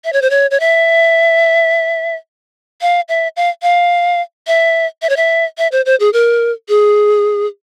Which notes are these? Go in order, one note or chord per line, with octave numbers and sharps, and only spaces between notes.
E5
C#5
C5
C#5
C#5
E5
F5
E5
F5
F5
E5
E5
C#5
E5
E5
C5
C5
G#4
A#4
G#4